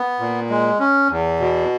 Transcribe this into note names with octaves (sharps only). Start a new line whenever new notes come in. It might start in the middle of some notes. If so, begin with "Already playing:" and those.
Already playing: B3
A#2
G#3
C#4
E2
B2